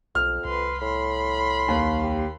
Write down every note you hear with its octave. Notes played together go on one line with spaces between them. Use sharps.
B1 F2 F6
C2 B4 C6
A2 B5 C6
D#2
G4